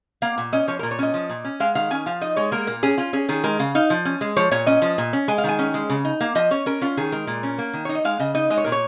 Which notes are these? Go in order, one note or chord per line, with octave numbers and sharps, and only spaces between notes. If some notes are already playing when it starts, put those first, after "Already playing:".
A#3 F5
A#2
C#4 D#5
F3 C#5
A#2 A#4
C#5
C#4 D#5
F3
A#2
C#4
G#3 F5
D#3 F5
C#4 G#5
F3 F5
D#4 D#5
G#3 C#5
A#3 A#4
A#2 A#4
C#4 G#4
C#4 F4
C#4 G#4
D#3 G#4
G#3 A#4
C#3 F5
D#4 F5
F3
C#4
G#3
F3 C#5
A#2 C#5
C#4 D#5
F3
A#2
C#4
G#3 G#5
F5
D#3 G#5
C#4
G#3
C#3
D#4
A#3 F5
F3 D#5
C#4 C#5
C#4 A#4
C#4 F4
D#3 G#4
G#3 A#4
A#2
C#4
A#3
D#3
D#4 C#5
D#5
G#3 F5
C#3 D#5
D#4 D#5
G#3 D#5
C#5
A#2 A#4
C#5